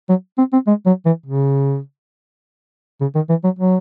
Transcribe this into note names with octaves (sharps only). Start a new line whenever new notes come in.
F#3
C4
C4
G#3
F#3
E3
C#3
C#3
D#3
E3
F#3
F#3